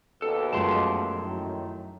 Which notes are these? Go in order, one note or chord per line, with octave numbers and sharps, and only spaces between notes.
D#2 B2 A4
F#2 F3 G#3 A3 A5 C6
A2 D#3